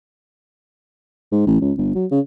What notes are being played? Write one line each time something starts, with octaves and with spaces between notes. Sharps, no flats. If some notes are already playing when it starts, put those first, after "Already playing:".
G#2
A1
C#2
G1
F#3
C#3